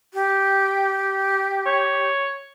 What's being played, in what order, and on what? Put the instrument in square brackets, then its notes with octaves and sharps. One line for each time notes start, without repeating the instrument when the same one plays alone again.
[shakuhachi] G4
[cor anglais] C#5